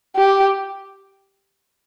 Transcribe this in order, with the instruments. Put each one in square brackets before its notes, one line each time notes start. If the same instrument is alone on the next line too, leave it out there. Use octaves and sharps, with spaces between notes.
[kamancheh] G4